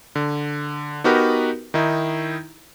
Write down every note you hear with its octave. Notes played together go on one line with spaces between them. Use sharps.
D3
B3 D#4 F#4 G4 A#4 B4
D#3 D#4 E4